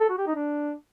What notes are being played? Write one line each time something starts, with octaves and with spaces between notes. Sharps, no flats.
A4
F#4
G4
D#4
D4